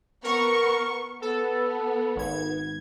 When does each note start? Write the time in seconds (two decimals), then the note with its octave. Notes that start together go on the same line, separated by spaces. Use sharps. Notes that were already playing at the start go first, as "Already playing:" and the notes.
0.24 B3 A#4 C#6
1.22 B3 A4
2.16 G#1 G#6